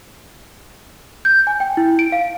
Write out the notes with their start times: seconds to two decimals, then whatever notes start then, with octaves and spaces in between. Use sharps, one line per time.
1.25 G6
1.47 G#5
1.60 G5
1.77 E4
1.99 D7
2.12 F5